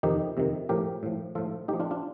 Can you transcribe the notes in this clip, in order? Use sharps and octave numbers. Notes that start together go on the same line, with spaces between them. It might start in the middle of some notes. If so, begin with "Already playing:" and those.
F2 C3 D#3 D#4 G4
F2 C3 D#3
A2 F3 G4 A#4
A2 F3
A2 F3 F4 A4
A2 F3 D#4 G4
D4 F4
D4 F4